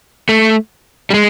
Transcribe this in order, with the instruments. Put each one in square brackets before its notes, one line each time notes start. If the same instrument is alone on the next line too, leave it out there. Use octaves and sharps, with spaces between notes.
[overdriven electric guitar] A3
G3
G#3